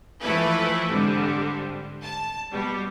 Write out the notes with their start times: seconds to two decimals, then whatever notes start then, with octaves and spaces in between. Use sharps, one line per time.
0.21 E3 F3 A3 E4 A4 B4
0.91 G#2 D3 G3 C4
2.03 A5
2.51 B2 G3